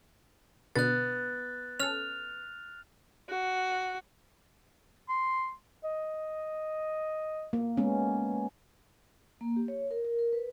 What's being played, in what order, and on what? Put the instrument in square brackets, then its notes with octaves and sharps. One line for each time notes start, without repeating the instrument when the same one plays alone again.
[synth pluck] B2 D3 [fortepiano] B3 [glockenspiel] F#6 A6
[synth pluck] C#4 A4 [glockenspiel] F6 F7
[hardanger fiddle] F#4
[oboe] C6
[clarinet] D#5
[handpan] A#3
G#3 B3 C#4
[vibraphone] A#3
G4
C#5
A#4
A#4
A#4
B4